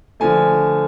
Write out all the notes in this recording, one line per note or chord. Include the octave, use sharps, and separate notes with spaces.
D3 F3 A3 G#5